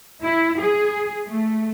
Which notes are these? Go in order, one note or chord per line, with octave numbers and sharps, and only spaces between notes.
E4
G#4
A3